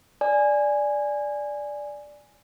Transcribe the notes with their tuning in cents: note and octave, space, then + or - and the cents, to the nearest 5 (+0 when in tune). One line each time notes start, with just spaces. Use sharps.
D5 +0 G#5 +0